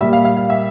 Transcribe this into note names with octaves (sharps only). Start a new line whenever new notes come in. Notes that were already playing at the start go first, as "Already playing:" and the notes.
A#2 G3 E5
F5
F5
F5
E5